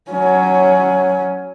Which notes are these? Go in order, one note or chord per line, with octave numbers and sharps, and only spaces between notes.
F#3 C#4